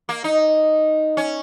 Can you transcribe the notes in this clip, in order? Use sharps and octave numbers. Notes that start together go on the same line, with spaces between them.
A#3
D#4
C#4